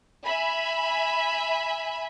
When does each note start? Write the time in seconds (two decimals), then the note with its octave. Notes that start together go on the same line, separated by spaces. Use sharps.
0.24 E5 G#5 B5